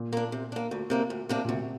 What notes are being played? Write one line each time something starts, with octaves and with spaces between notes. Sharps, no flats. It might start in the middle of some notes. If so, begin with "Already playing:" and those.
Already playing: A#2
A#3 D4
C3
A#3 D4
D2
C3 A#3 D4
D2
C3 A#3 D4
A#2
D2 C3